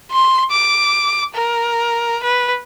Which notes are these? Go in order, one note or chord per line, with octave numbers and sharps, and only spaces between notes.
C6
D6
A#4
B4